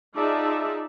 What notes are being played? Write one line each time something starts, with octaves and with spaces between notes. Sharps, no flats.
D#4 F4 G#4 D5 E5 A5